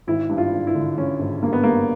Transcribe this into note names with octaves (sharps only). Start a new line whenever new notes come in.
G#1 E4
G2
F4
G#1
E4
D3
D3 C#4
G#1
G2 A#3
B3
G2 A#3